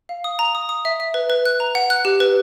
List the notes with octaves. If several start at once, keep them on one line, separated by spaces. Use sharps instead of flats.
F5
D#6
A#5
D#6
D#6
E5
E5
B4
B4
F#6
A#5
F#5
F#6
G4
B4